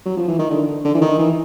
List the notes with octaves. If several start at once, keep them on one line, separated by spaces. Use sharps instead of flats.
F#3
F3
E3
D#3
D3
D3
E3
D#3
E3